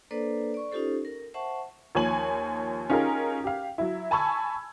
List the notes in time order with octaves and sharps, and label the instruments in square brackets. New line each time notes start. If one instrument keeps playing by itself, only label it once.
[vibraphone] A#3 D4 A4 B4 C5 D5
D5 C#6
C#4 D#4 F4 G4 A4 C5
A#4
C5 E5 F#5 A5 C#6
[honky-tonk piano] D#2 F3 C#5 G#5 F#7
C#4 D#4 F4 G4 G#4 A#4
G4 F5
F#3 E4
G#5 A5 B5 C#6 E6 G#6